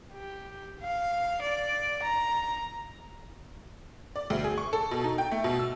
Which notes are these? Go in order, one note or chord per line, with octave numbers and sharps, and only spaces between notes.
G4
F5
D5
A#5
D5
D2
G#4
C#6
A4
B2
D#4
G5
A3
B2
E6